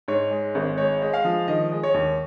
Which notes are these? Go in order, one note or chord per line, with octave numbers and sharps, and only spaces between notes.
G#2 C#5
G#3
G#1
G#3 C#5
G#3
F5
F3
D#3 D#5
G#3
C#5
D#2